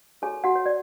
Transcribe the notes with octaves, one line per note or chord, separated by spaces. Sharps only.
F#4 G#4 A4 C#5 G#5
F#4 F#5
C#5
D5